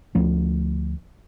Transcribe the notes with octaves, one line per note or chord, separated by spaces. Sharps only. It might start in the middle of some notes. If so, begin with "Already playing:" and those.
D2 F3 A3